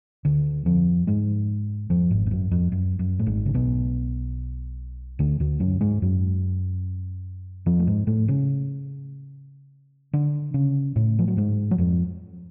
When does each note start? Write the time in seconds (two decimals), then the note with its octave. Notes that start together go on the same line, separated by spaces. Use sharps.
0.25 D2 D3
0.66 F2 F3
1.07 G#2 G#3
1.90 F2 F3
2.11 G#1 G#2
2.26 G#2
2.31 F#2
2.51 F2
2.72 F#2
2.99 F#2
3.19 A2
3.26 G#1 G#2
3.46 C#3
3.54 B1 B2
5.19 D2 D3
5.40 D2 D3
5.60 F#2 F#3
5.81 G#2 G#3
6.02 F#2 F#3
7.66 F2 F3
7.79 A3
7.87 G#2 G#3
8.07 A2 A3
8.28 C#3 C#4
10.13 D3 D4
10.54 C#3 C#4
10.96 A2 A3
11.19 F3
11.28 F#3
11.37 G#2 G#3
11.71 F#3
11.78 F2 F3